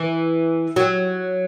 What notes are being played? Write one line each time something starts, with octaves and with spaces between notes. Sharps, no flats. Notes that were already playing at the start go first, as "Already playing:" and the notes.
Already playing: E3
F#3